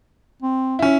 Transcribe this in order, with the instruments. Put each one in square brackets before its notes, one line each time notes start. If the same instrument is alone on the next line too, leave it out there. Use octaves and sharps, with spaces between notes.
[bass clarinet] C4
[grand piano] C#4 E4